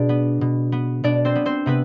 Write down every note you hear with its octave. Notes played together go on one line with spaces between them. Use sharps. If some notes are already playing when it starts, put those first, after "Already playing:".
Already playing: B2 D4 G#4 D5
B3
B2
B3
B2 D4 D5
C4 C5
B3
C4 C5
C3 B3 B4